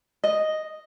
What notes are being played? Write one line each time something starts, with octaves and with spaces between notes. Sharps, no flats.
D#5